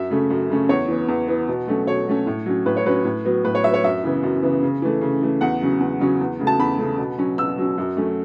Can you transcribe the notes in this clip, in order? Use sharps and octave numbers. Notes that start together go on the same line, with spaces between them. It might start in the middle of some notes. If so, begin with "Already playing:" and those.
Already playing: F#2 E5
C#3 A3 C#4
F#2
C#3 A3 C#4
E2 C#5
E3 B3
E2
E3 B3
B2
F#3 A3 C#4
B2 C#5
F#3 A3 C#4
A2
F#3 C#4
A2 B4
C#5
F#3 C#4 B4
A2
F#3 B3
A2 B4
C#5
F#3 B3 E5
C#5
F#2 E5
C#3 E3 B3
F#2
C#3 E3 B3
C#3
E3 A3
C#3
E3 A3
E2 F#5
C#3 F#3 C#4
E2
C#3 F#3 C#4
E2
C#3 A3
A5
E2 B5
C#3 A3
B2
F#3 C#4
B2 E6
F#3 C#4
F#2
F#3 A3 C#4